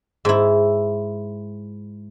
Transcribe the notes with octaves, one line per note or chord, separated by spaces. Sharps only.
G#2 E4